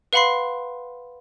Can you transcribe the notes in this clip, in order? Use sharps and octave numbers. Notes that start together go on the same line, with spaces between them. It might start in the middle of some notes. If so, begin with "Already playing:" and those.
B4 F5 F#5 B5 C6 C7